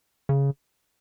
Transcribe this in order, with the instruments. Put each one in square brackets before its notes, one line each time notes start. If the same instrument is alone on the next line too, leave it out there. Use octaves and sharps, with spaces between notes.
[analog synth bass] C#3